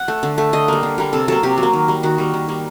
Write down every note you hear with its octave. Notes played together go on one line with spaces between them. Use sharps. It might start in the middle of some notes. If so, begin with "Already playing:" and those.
Already playing: F#5
A3
D3
A3
D3 D#5
G3 A#3
D3
G3 A#3
C3 A4
F#3 A#3 A4
C3 G4
F#3
A#3
D#3
G3 A#3
D#3 F#4
G3 A#3
D#3
G3 A#3